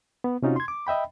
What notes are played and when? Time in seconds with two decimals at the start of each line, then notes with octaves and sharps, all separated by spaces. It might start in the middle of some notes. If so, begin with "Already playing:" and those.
0.24 B3
0.43 C3 C#4 D#4 F4 F#4
0.56 C6 G#6
0.68 D6
0.87 D#5 E5 G5 B5